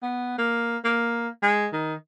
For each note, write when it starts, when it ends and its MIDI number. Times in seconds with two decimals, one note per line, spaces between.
0.03 0.38 59
0.38 0.77 58
0.85 1.29 58
1.43 1.68 56
1.73 1.94 51